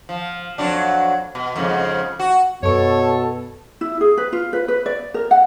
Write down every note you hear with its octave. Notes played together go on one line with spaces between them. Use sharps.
F3
F2 F#3 D4
B2
F2 G#2 C#3
F#4
F#2 B2 A4 C#5 A5 C#6
E4
G#4
B4
F4
B4
B4
D5
A#4
F#5